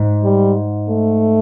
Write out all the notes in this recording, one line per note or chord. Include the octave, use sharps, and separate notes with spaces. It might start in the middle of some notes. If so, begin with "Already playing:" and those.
Already playing: G#2
G3
A3